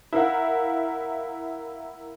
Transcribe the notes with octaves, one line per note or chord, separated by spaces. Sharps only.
E4 A#4 F5 F#5